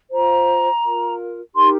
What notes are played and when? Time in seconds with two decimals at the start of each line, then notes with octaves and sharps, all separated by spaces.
0.10 F4 C5 A#5
0.83 F4 A#4
1.54 D#4 G4 A#4 C6